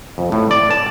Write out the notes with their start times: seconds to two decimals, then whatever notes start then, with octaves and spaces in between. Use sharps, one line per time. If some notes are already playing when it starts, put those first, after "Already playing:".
0.18 F2
0.32 A2
0.51 D5
0.71 A5